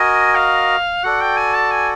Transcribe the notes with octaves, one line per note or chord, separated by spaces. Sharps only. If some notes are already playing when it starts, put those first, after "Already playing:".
Already playing: F#4 A#4 D#5 G#5
F5
F#4 A4 D5 F#5
G5
G#5
A5
G#5